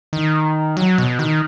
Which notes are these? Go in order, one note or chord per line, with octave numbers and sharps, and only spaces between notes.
D#3
F#3
B2
D#3